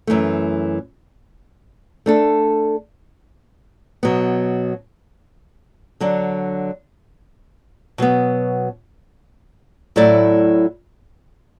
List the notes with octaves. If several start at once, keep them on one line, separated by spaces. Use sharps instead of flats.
F#2 E3 A3
A3 D4 A4
B2 F#3 B3
D3 F#3 D4
B2 F#3 B3
A2 F#3 A3 E4 D5